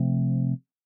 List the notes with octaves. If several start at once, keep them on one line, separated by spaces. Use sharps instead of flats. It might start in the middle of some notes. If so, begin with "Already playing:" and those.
Already playing: C3 F3 A3 C4